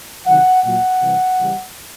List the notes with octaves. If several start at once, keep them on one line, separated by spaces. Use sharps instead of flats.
C3 D#3 F#3 F#5
A#2 F#3 F#5
C3 E3 G3
C#3 E3 G3